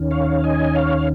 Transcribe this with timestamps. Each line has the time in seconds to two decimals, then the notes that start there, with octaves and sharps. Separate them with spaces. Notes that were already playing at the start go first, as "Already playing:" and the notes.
Already playing: D#2 D#3 C#4
0.11 C#5 F5
0.43 D#5 G#5
0.75 C#5 F5